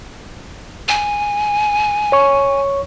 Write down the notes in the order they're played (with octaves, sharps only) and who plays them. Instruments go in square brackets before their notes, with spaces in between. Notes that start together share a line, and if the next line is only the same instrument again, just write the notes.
[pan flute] G#5
[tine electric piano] C#5 C#6